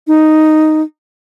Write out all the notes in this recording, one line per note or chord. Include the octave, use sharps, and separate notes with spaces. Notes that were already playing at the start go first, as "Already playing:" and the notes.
D#4